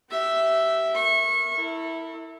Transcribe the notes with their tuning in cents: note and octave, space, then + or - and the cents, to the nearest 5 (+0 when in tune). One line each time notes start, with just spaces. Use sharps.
G4 -30 E5 +0
A#4 +0 C#6 -25
E4 -10 A4 +40